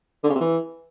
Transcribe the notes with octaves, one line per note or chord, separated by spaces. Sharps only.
D3
C#3
C3
E3